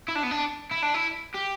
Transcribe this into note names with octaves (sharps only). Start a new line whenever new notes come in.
E4
D4
B3
D4
E4
D4
E4
G4